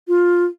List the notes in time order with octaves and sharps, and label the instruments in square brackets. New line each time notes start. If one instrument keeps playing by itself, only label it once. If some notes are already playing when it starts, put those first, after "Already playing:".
[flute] F4